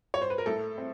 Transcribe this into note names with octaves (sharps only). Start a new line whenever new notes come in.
C#5
C5
B4
A#4
A2 A4
C4